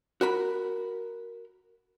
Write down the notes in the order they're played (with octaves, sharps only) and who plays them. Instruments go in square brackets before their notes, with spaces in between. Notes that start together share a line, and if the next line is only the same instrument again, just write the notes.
[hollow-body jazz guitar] F#4 A#4 B5